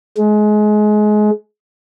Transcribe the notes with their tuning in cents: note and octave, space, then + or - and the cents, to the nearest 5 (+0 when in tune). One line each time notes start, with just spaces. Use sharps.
G#3 +25